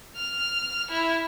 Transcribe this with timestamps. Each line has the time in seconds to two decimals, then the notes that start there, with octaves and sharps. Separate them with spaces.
0.16 F6
0.91 E4